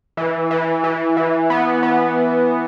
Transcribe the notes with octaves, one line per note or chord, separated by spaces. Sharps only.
E3
E3
E3
E3
B3
B3